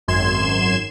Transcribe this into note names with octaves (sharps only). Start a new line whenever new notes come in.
G#1 F#2 C6 G#6 E7